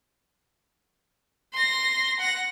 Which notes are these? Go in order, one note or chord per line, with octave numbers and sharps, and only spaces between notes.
C6 A#6
F#5 A#6